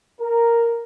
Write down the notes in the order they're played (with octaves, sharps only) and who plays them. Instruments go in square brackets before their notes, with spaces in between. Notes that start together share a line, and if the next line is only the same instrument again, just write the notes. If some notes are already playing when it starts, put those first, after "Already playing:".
[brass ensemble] A#4